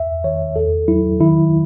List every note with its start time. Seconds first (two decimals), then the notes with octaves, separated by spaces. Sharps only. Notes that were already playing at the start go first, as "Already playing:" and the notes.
Already playing: E2 E5
0.24 D#3 C#5
0.56 E2 A4
0.88 F#3 E4
1.20 D#3 E4